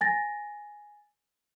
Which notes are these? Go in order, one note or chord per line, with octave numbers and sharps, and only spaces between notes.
G#5 A6 A#6